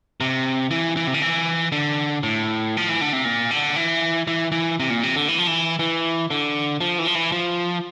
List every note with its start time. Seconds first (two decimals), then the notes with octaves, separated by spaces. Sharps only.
0.21 C3
0.71 E3
0.97 E3
1.07 C3
1.14 D3
1.22 E3
1.72 D3
2.23 A2
2.77 F3
2.89 E3
3.01 D3
3.13 C3
3.25 A#2
3.51 D3
3.76 E3
4.27 E3
4.52 E3
4.80 C3
4.90 A#2
5.03 C3
5.16 D3
5.28 E3
5.38 F3
5.47 E3
5.79 E3
6.30 D3
6.81 F3
6.99 E3
7.07 F3
7.15 E3
7.32 F3